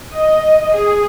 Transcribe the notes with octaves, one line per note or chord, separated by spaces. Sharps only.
D#5
G#4